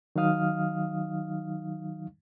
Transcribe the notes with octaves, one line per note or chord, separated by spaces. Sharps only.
D#3 F#3 D#4 F5 D#6 F6